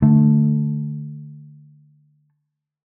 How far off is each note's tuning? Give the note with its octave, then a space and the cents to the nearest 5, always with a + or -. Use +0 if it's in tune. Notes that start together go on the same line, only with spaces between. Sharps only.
D3 +15 A3 +0